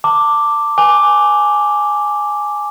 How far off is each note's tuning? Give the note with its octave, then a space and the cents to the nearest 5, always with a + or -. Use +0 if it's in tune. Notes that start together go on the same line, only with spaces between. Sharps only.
A5 +25 D6 +0
G#5 +0 D6 +0